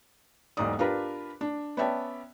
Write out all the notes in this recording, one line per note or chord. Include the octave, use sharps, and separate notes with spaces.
E1 B1 G#2 D#4 D5 D#6
D4 F4 G4 A#4 B4
D4
B3 C#4 D5 E5 G5 A5